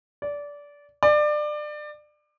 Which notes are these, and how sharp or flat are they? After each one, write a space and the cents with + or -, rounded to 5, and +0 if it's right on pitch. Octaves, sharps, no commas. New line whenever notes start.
D5 -20
D5 +25